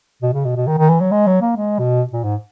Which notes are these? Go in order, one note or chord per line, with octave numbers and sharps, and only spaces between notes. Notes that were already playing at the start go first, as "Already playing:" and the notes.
B2
C#3
B2
B2
D#3
D#3
E3
F#3
G#3
F#3
A#3
G#3
B2
A#2
G#2